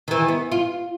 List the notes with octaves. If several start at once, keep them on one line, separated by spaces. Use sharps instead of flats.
D#3 E3
B3
F4